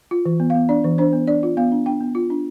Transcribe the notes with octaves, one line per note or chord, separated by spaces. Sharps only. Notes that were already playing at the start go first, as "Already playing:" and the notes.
F4
E3
B3
B3 F5
D4 D5
E3
D4 C5
B3
D4 D5
F4
B3 F5
D4
D4 G5
B3
F4
D4